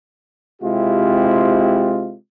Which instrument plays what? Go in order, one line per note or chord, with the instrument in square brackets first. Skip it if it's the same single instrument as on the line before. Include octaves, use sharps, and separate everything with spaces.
[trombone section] C3 G#3 C4 E4 F4 G4